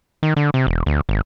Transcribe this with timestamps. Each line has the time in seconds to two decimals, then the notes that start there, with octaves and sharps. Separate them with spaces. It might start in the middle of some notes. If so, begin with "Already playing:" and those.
0.23 D#3
0.36 D3
0.54 C3
0.67 E1
0.86 D2
1.09 G#1